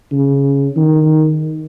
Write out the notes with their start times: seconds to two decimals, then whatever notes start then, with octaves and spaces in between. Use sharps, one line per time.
0.12 C#3
0.76 D#3